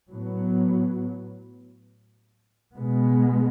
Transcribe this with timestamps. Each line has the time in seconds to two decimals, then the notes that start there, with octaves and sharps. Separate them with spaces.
0.12 A2 F#3 B3
2.76 B2 G#3 B3